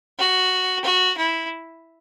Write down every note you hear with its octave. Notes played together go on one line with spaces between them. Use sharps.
F#4
F#4
E4